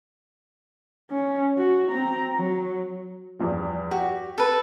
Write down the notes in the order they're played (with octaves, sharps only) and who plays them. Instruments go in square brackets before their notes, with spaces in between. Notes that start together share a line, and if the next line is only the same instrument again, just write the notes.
[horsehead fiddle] C#4
F#4
C4 A#5
F#3
[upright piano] E2 G2 F3
[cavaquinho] F#4 [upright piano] G4
[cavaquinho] A4 B4